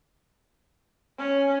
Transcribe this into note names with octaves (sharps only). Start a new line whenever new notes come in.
C#4